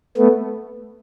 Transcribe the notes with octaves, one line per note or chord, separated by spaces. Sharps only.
A3 B3